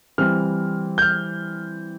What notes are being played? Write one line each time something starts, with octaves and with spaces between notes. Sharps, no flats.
E3 G3 C4 F6
G6
F6